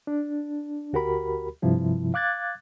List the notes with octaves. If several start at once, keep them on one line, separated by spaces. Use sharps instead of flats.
D4
D2 F#4 G4 A#4 B5
G2 C3 F3 E4
F5 D6 F#6 G#6 A6